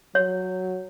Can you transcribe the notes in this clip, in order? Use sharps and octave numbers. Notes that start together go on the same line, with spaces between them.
F#3 C#5